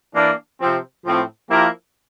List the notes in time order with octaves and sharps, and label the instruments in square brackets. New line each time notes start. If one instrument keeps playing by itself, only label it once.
[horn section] E3 A#3 D4
C3 F3 C4
A2 F3 C4
F3 A#3 E4 G4 A#4